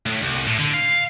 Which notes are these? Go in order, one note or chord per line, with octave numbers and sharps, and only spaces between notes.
A2
C2
A2
D3
F5